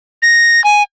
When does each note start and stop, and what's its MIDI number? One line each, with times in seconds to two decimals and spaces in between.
0.22 0.63 94
0.64 0.83 80